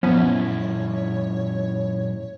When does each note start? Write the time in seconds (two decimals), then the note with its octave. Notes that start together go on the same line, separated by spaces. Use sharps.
0.03 F#2 A#2 F3 B3 C#4 E4 C#5